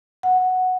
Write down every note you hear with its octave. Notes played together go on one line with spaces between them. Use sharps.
F#5